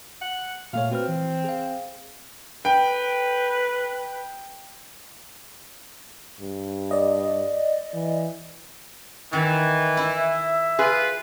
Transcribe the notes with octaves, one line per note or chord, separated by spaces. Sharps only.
F#5
A#2 A3 C#5 F5
C4 F#4 B4 F6
E3
G#4 F5
B4 G5
G2
D5 D#5
E3
D#3 E3
E4 E5
F4 G#4 B4